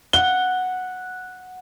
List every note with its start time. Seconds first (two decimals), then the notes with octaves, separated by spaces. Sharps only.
0.13 F#5 G7